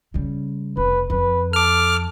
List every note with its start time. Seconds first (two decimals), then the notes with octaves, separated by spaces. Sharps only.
0.14 C#3 G3
0.77 F1 B4
1.10 F2 B4
1.53 A4 D6 F6